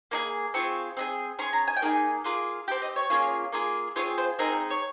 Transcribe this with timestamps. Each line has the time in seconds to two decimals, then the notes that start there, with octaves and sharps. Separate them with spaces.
0.11 A#3 D#4 G#4
0.54 C4 F4 G#4 C#6
0.97 C4 D#4 G#4
1.39 C#4 C6
1.42 G#4
1.53 A#5
1.67 G#5
1.77 G5
1.82 A#3 D#4 G#4 G#5
2.24 A#3 F4 G#4
2.68 G4 G5
2.71 C4
2.82 D#5
2.96 C#5
3.10 A#3 C#4 F4 G#4
3.52 A#3 F4 G#4
3.96 C4 F4 G#4 C#5
4.18 C5
4.39 C4 D#4 G#4 A#4
4.70 C#5